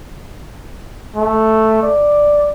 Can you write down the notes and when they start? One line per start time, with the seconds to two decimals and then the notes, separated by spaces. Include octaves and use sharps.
1.16 A3
1.83 D5